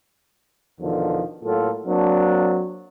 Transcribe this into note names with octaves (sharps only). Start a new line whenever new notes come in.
E2 B2 D3 D#3 F3
A2 F#3 A#3 F4 A4
F#3 A#3 C4 D4